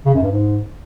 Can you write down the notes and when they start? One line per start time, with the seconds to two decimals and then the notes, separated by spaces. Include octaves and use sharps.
0.05 C#3
0.14 F#2
0.23 G2
0.32 G#2